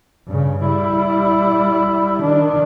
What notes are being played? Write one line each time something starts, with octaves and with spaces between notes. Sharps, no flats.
G2 C#3
G3 E4
D#3 D4